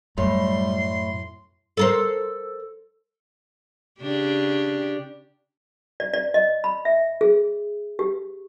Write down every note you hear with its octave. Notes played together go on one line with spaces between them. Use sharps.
F#2 A2 G3 C6
A4 A#4 C5
C#3 D4 G4
D5
D5
D#5
B5
E5
G#4
G4